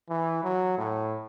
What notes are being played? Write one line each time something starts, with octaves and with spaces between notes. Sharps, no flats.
E3
F#3
A2